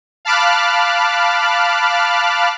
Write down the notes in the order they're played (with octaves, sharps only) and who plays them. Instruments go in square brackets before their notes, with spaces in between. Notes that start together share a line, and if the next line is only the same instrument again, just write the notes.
[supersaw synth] F5 A5 B5 D6 F6 F#6